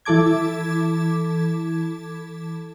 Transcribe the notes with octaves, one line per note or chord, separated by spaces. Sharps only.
E3 E4 A4 A5 D6 G#6